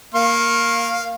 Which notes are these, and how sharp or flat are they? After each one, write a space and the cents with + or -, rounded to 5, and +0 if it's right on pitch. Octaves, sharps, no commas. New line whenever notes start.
A#3 +0 F5 +0 C#6 -35